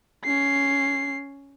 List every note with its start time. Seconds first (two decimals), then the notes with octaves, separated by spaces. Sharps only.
0.25 C#4 C7